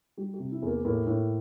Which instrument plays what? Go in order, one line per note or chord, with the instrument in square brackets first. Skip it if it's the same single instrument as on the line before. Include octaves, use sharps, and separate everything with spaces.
[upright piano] G3 G4
G4
C3
E4
E2 A#3
A2 A#3
A2